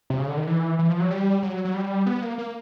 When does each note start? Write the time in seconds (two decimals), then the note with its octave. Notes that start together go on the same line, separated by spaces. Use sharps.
0.10 C3
0.19 C#3
0.28 D3
0.37 D#3
0.47 E3
0.79 E3
0.89 F3
1.00 F#3
1.10 G3
1.43 F#3
1.65 F#3
1.74 G3
2.06 B3
2.22 A#3
2.38 A#3